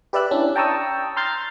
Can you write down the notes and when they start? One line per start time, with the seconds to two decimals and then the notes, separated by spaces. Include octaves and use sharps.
0.13 G4 B4 D5 E5 E6 F#6
0.31 C#4 D4 E4
0.56 G5 A5 A#5 C#6 D#6 E6
1.16 A#5 C6 F6 G6 A6 C7